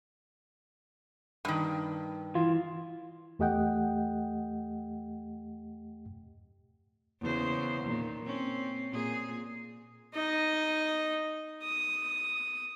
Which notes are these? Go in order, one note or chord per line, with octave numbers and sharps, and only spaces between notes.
G2 D#3
E3 F4
E2 A3 G4 D#5 F#5 G5
E2 C#3 C5
A#2 D#3
C4 C#4
A#2 G#4
D#4 D#5
D#6